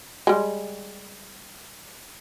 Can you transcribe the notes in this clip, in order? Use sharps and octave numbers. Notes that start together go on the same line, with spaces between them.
G3 G#3